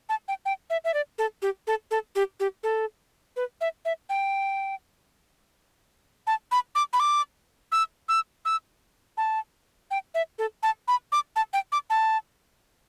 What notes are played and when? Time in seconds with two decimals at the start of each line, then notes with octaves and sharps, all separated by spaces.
0.09 A5
0.28 G5
0.45 G5
0.70 E5
0.84 E5
0.94 D5
1.18 A4
1.42 G4
1.67 A4
1.91 A4
2.15 G4
2.40 G4
2.63 A4
3.36 B4
3.61 E5
3.85 E5
4.09 G5
6.27 A5
6.51 B5
6.75 D6
6.93 B5
7.00 D6
7.72 E6
8.09 E6
8.45 E6
9.17 A5
9.91 G5
10.14 E5
10.38 A4
10.63 A5
10.88 B5
11.12 D6
11.36 A5
11.53 G5
11.72 D6
11.90 A5